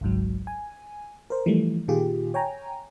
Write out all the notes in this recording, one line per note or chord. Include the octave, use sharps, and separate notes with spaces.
G#1 C#2 G#2 F#3
G#5
A#4 C5
E3 F3 G3 A3
A#2 D#3 F4 G4 G#4
C#5 G5 G#5 A#5